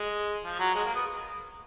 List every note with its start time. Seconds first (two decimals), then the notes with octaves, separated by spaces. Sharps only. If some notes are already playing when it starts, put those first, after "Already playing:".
Already playing: G#3
0.44 F3
0.59 F#3
0.75 G#3
0.85 A#3
0.95 B3